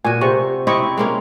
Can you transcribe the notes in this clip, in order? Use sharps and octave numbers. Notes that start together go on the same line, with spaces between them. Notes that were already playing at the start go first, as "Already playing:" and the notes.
A#2 F#4 G#5
C3 G#4 C5 C#6
C4 E4 G4 D#5 C#6
G#3 A#3 C#4